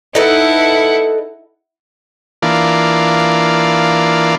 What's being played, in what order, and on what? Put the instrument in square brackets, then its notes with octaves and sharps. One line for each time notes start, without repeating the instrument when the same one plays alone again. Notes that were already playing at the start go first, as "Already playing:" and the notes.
[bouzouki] D#4 A4 B4 [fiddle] E4 F#5
[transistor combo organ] E3 A#3 D4 F4